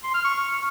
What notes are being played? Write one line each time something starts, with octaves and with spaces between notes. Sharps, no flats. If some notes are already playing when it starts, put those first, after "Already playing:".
C6
F6
C#6